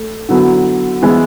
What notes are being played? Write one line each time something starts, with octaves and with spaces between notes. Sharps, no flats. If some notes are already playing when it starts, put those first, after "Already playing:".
Already playing: A3
D3 F#3 B3 E4
E3 G#3 B3 E4